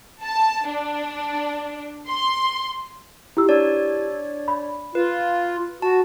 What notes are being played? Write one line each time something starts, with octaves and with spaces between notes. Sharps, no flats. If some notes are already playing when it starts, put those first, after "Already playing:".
A5
D4
C6
E4 G4 E6
D4 C#5 D5
B5
F4 B4
F#4 A5